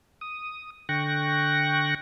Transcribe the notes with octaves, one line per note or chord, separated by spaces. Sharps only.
D#6
D3 G5 C#6 F#6 A#6